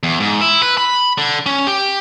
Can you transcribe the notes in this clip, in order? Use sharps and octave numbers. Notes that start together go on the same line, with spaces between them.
E2
G#2
E4
B4
B5
D3
C#4
G4